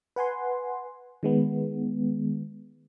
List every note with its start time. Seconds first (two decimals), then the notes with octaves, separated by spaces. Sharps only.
0.16 B4 F#5 G#5 C6
1.23 D#3 G#3 B3